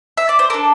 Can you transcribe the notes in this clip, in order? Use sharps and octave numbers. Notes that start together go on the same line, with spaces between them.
E5
D5
C5
D4 A4 A#4